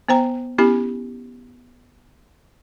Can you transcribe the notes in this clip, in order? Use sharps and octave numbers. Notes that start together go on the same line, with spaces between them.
B3 C5 G5 A#5
B3 C#4 E4 G4 G#5